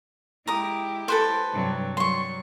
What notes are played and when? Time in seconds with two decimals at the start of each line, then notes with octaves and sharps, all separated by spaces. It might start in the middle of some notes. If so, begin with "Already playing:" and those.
0.47 G#3 E4 G4 A#5 D#6
1.08 A4 B4 C5
1.53 G2 C3 F#3
1.97 F#3 G3 C6 C#6